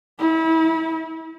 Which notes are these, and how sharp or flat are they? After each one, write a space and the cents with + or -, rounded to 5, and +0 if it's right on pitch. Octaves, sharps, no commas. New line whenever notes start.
E4 -30